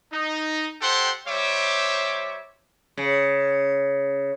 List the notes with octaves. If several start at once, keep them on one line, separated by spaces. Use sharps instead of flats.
D#4
G4 A4 C5 F#5 G5 C6
G3 C5 C#5 E5 D6
C#3